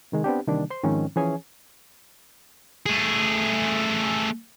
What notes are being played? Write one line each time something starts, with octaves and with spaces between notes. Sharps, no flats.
C3 D#3 G#3
B3 C4 D4 G4
C3 D#3 E3 G3 A#3 D4
C5 C6
G#2 D#3 F3 G#3 C4 C#4
E3 F3 C#4 G#4 C#5 G#5
A3 G#4